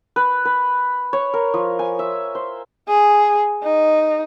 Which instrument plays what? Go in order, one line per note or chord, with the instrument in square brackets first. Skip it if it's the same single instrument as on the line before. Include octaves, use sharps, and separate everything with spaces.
[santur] B4
B4
C#5
A#4
F3
G#5
E5
C5
[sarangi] G#4
D#4